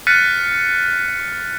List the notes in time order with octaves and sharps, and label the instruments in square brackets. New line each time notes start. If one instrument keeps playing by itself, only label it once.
[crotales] F6 F#6 A6 B6 C#7 D#7